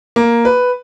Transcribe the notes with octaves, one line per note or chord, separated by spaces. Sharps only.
A#3
B4